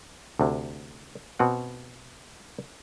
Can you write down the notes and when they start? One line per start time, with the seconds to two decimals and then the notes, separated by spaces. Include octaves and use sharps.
0.39 D2 C3
1.39 B2 C4 F#5